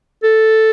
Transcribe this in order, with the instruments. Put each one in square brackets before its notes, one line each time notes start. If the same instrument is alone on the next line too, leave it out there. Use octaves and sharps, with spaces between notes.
[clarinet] A4